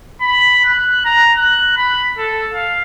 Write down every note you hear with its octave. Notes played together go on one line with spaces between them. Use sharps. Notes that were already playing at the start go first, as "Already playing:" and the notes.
B5
F#6
A#5
F#6
B5
A4
F5